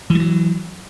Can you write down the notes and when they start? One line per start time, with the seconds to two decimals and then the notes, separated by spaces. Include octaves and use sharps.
0.10 E3
0.15 G3
0.20 F#3